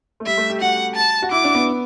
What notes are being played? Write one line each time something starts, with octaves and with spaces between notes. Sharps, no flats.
A3
G3 E5
A3
G4
F#4 F#5
A5
F#4
E4 D6
D4
B3